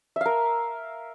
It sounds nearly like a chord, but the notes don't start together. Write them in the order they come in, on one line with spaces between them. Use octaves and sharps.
E5 F5 A#4